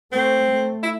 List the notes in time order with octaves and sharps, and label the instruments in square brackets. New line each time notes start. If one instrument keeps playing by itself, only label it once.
[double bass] A3 [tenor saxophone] C4
[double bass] A3
[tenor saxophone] E4